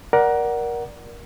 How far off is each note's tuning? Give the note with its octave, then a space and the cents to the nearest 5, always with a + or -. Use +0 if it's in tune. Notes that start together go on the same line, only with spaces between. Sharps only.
A#4 +20 D5 +0 F#5 +10